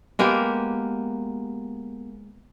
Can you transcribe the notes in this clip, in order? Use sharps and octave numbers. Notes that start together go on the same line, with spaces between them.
G#3 A#3 B3 G4